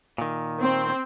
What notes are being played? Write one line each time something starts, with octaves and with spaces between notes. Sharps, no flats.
A#2 D#3
C4